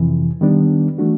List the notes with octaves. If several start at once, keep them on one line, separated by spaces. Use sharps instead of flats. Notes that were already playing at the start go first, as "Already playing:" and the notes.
Already playing: F2 C3 E3
D#3 G3 B3 D4
E3 A3 D4 F#4